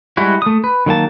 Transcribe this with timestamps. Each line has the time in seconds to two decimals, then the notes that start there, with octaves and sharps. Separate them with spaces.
0.17 G3 G#3 E4 F#4
0.42 A3 D#6
0.64 B4
0.86 D#3 F#3 A#3 A5